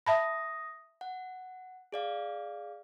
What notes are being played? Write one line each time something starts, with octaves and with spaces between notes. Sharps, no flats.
E5 A5 B5 D#6 A#6
F#5
G#4 D5 F5